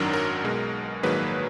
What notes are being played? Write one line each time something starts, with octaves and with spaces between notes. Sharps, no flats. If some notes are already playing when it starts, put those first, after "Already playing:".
Already playing: G#1 F#2 D#3 F#3 D4 A#4
A#4
B1 B2 G#3
A#1 G#2 D#3 F#3 A#3 G#4 B4